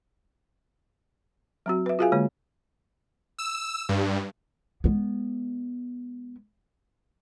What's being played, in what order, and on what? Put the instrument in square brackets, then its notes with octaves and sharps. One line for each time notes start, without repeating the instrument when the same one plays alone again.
[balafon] F#3 C4 F#4
B4 E5
F4 F#4 G#4 E5 F5 G#5
D3 G#3 A#3 C#5
[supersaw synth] E6
G2
[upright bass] G#3 B3